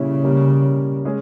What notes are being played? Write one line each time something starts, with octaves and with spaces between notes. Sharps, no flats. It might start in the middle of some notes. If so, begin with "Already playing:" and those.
Already playing: A#2 C#3 G3 C#4 E4
G3 A#3 C#4
G#3 C#4 G#4